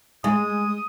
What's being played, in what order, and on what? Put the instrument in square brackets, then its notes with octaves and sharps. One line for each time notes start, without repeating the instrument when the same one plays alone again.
[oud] G#3 [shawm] D#6